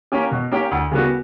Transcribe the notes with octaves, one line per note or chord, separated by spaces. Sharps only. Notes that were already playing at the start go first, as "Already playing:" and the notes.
A#3 C#4 G4
B2
A#3 C#4 G4
D2
C#3 G3 B3 F#4